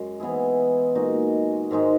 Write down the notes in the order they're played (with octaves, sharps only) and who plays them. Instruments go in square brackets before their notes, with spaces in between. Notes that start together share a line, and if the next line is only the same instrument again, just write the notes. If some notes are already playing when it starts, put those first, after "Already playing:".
Already playing: [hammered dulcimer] F#2 G#3
E3 B3 E4 G#4
A#2 G#3 D#4 F#4
G#2 D#3 G#3 D#4